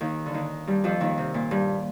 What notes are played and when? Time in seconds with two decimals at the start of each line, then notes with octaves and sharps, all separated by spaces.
0.01 D#2 D#3
0.26 D3
0.34 D#2 D#3
0.67 G2 G3
0.84 F2 F3
1.01 D#2 D#3
1.18 C3
1.34 A#2
1.51 G2